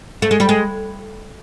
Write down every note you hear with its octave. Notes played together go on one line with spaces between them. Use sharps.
A3
G#3
G3
G#3